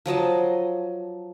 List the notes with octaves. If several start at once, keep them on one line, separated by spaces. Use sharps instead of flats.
F3 F#3 D#5 A5